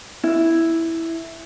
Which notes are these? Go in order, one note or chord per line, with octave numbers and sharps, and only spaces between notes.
E4